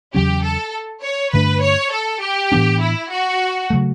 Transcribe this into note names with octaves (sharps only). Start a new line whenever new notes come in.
E2 C#3 F#3 C#4 G4
A4
C#5
G2 D3 A3 D4 B4
C#5
A4
G4
A2 E3 B3 D4
E4
F#4
C#3 F#3 A3